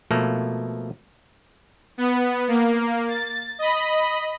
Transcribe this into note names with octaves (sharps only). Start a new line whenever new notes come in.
B2 F3 A3 A#3 A4
B3
A#3
A6
D#5 B5